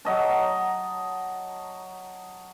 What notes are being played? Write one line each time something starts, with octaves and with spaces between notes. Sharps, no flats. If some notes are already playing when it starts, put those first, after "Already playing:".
F#3 D#5 A5